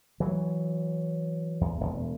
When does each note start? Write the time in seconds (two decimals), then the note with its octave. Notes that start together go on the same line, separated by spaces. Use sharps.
0.20 E3 F#3
1.61 E2
1.81 E1